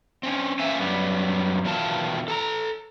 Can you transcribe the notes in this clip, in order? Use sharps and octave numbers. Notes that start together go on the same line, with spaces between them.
C4 C#4
A#3 C4 C#4 E5 G#5
F#2 G3 B3
E2 B2 D#3 F4 A#4 A5
A4 A5 A#5